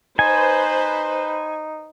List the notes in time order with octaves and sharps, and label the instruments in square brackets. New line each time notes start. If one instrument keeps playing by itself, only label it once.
[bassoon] D#4 [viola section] B4 C5 [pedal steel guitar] G#5